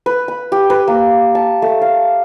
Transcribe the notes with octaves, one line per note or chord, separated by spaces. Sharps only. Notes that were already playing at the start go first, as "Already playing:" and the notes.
B4
B5
G4
B4
A#3
A5
A3
F5